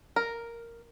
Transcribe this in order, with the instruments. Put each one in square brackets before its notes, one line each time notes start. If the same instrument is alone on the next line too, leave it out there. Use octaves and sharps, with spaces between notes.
[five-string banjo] A#4